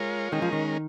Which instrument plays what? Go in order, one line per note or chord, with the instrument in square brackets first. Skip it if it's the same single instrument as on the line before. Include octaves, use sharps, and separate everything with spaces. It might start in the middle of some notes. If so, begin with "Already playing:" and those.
Already playing: [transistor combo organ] G#3 F4 A#4 C#5
[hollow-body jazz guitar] D#3 [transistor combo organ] G#3 C#4 A#4 D#5
[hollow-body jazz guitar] F3
D#3